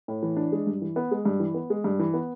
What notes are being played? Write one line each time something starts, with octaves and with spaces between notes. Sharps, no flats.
A2
E3
D4
G#3
G2
E3
B3
G#3
G2
E3
B3
G#3
G2
E3
B3